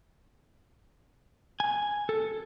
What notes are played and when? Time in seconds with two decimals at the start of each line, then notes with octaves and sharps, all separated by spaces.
1.60 G#5
2.09 A4